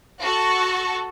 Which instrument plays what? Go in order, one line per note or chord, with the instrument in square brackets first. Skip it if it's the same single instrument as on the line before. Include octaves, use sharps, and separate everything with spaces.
[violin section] F#4 A4 A5 C#6